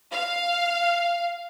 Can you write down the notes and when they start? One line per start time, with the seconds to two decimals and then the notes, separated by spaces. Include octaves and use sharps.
0.13 F5